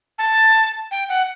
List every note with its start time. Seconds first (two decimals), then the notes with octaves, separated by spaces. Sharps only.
0.19 A5
0.91 G5
1.09 F#5